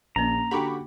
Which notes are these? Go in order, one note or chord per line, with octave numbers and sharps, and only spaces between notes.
A#1 A#3 C#4 A#5
D3 F#4 G4 F#5 G5 B5 C#6 D6